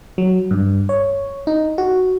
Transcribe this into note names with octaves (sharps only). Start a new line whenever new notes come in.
F#3
G2
C#5
D#4
F#4